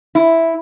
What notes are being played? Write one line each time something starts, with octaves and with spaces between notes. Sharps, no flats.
E4